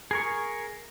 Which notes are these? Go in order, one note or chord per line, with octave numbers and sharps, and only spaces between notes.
G#4 A#4 C#6